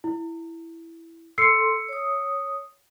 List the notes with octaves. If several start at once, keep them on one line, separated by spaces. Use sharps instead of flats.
E4
A4 C6 E6 C7 C#7
C#5 D#6